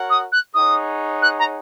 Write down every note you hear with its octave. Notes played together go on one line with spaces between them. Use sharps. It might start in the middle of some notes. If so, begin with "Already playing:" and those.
Already playing: F#4 A#4 C#5 F#5
D#6
F#6
D#4 G#4 C#5 F#5 D#6
F#6
A#5